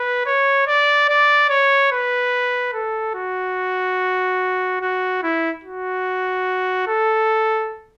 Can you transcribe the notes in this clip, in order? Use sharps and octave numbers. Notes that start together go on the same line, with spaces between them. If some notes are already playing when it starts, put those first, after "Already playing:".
Already playing: B4
C#5
D5
D5
C#5
B4
A4
F#4
F#4
E4
F#4
A4